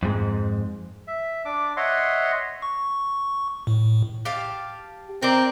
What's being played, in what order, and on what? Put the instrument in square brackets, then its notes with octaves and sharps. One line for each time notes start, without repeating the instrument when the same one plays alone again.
[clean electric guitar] F2 G#2
[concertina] E5
D4 D6
C#5 D#5 E5 F#5 C6
[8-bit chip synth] C#6
A2
[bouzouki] G4 F5 A5
[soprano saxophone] C4 [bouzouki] A#4 D5